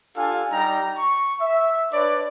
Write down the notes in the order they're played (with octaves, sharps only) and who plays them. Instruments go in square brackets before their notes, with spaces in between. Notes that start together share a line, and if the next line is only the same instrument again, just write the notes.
[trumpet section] D4 F4 G4 A4 F5 G#5
G3 D#4 G5 A#5
C#6
E5
D4 B4 C#5 D5